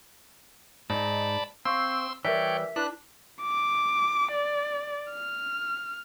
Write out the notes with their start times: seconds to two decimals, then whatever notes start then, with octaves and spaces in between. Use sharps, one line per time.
0.90 G#2 D#4 D5 A5 B5
1.65 C4 F5 C6 C#6 E6
2.25 E3 G3 A#4 C#5 D5 E5 G5 B6
2.76 D4 E4 B4 F#6
3.42 D6
4.32 D5
5.12 F6